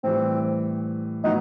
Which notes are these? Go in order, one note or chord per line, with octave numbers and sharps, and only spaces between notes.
A2 E3 G3 C4
A2 F#3 B3 D#4